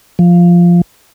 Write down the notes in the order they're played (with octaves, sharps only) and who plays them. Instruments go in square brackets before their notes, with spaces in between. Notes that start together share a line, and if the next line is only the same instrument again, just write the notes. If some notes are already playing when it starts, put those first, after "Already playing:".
[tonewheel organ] F3